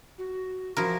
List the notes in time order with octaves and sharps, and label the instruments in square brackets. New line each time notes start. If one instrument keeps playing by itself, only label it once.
[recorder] F#4
[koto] F3 E4 A#4 [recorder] F#4